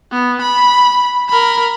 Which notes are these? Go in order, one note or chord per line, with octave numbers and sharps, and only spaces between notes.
B3
B5
A#4 B5